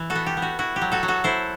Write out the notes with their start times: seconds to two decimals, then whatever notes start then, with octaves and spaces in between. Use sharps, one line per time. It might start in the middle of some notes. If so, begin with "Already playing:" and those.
Already playing: E3
0.10 F#4 A4
0.15 B3
0.26 G4
0.37 B3
0.42 F#4
0.59 E4 F#4
0.76 G4
0.82 F#3
0.92 F#4 A4
1.03 F#3
1.08 F#4 A4
1.24 E4 A4 C5